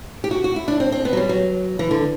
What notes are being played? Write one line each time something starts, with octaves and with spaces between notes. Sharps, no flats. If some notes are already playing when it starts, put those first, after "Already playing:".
G4
F#4
F#4
E4
D4
C4
C4
B3
F#3
G3
F#3
E3
D3